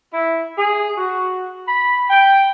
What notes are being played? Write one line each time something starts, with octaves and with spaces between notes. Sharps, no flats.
E4
G#4
F#4
B5
G5